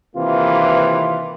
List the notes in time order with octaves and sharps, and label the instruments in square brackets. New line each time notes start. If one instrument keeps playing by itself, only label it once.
[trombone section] D#2 C3 E3 A#3 F4 B4